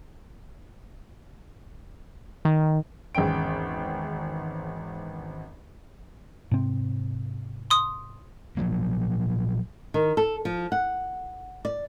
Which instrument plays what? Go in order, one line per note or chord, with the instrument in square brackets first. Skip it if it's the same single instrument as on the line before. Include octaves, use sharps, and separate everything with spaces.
[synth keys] D#3
[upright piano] G#1 E2 C#4 G5 D7
[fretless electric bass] G#2 C3 C4
[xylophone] C6 D#6
[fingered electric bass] A#2 F3 F#3 A#3
[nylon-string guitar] D#3
A4
F3
F#5
D5